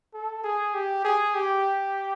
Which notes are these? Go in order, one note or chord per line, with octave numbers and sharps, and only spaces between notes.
A4
G#4
G4
G#4
G4